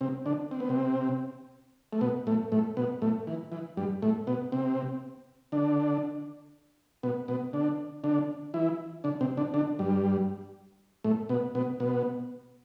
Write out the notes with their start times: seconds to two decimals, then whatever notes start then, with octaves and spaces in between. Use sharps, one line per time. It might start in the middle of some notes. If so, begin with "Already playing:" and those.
0.01 C3 C4
0.26 D3 D4
0.51 C4
0.60 B3
0.69 C3 C4
1.93 A3
2.01 B2 B3
2.27 A2 A3
2.52 A2 A3
2.77 B2 B3
3.02 A2 A3
3.27 E3
3.52 E3
3.77 G2 G3
4.02 A2 A3
4.27 B2 B3
4.52 C3 C4
5.52 D3 D4
7.03 B2 B3
7.28 B2 B3
7.53 D3 D4
8.04 D3 D4
8.54 E3 E4
9.04 D3 D4
9.21 C3 C4
9.37 D3 D4
9.54 D3 D4
9.79 G2 G3
11.04 A2 A3
11.29 B2 B3
11.55 B2 B3
11.80 B2 B3